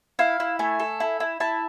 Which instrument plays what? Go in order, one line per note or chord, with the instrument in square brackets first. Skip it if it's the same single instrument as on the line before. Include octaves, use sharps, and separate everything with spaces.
[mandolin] E4 F5
E4
A3 G#5
A4
E4
E4
E4 A5